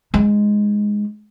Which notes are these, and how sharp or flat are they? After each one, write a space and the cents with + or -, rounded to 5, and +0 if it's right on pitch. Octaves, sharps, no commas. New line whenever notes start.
G#3 +0 D#4 +0